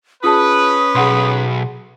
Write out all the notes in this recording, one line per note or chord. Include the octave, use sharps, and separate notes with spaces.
C#4 F4 G#4 B4 A5 D#6
B1 G#4 F#5 C6